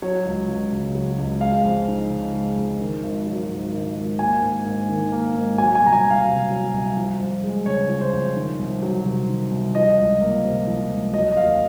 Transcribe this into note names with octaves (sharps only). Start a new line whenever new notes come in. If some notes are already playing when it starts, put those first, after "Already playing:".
F#3 C#5
C#2
C#2
C#3
F#3
C#2
G#3 F5
F2
D#4
C#3
G#3
F2
D#3
G#1
F#3
G#2
D#3
G#1
A#3 G#5
G#2
G#2
D#3
A#3
G#2
F#3 G#5
G#5
C2 A#5
G#5
C2
F5
C3
F#3
C2
F3
F2
G#3
C#3 C#5
F3
C5
F2
D#3
C2
F#3
C3
D#3
C2
F3 D#5
C#2
A#3
C3
F3
C#2
F#3 D#5
D#5
D#2 F5